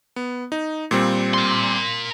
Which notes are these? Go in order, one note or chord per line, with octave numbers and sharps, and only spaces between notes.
B3
D#4
A#2 G3 C4
A#4 C6